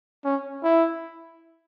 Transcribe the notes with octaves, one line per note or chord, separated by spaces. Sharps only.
C#4
E4